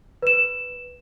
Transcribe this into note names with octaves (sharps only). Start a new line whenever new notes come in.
B4 E7